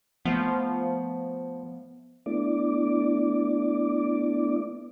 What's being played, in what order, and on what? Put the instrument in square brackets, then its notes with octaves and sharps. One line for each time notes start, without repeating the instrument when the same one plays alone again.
[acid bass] F3 [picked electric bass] A3 B3
[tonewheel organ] A3 B3 D4 E4 D5 D6